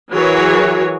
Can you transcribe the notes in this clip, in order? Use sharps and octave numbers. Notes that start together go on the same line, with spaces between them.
E3 F#3 F#4 G#4 A#4 C#5